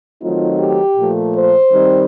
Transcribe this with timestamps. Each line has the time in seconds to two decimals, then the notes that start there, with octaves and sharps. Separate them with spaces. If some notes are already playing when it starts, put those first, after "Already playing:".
0.21 D#3 F#3 A3 C4 D#4 F4
0.58 G4
0.96 A#2 F3 A3
1.33 C5
1.71 D#3 G3 C4 D#4